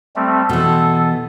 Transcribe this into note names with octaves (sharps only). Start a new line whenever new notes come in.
G3 A3 C4
B2 E3 A4